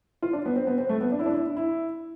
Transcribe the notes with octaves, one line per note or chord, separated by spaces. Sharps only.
F4
D4
B3
C4
B3
C4
A3
B3
D4
E4
D4
E4
E4